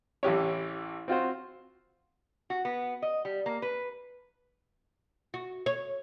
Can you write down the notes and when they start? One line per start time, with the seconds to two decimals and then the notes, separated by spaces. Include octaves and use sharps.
0.23 A1 E3 G4 C#5
1.08 C4 F4 F#4 C5
2.50 F#4
2.65 B3
3.02 D#5
3.25 G3
3.46 A#3
3.62 B4
5.34 F#4
5.66 C#5